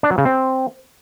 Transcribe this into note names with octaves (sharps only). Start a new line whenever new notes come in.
D4
F#3
C#3
C4